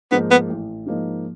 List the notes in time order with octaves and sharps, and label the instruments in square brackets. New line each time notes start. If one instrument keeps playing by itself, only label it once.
[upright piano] G#2 F3 A#3 D#4 [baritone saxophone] B3
[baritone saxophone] B3
[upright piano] A1
G#2 F3 A#3 D#4